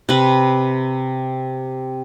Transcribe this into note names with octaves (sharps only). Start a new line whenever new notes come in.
C3 B4